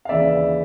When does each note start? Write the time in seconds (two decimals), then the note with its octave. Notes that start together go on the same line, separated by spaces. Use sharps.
0.05 F5
0.09 D#2 C#3 E3 D5 E5